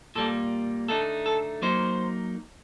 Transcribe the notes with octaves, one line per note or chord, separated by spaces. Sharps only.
A#2 G3 A#3 A4
D3 A3 D#4 A4
A4
F#3 A#3 D#4 C5